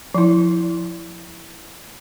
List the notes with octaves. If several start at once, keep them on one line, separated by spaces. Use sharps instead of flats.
F3 E4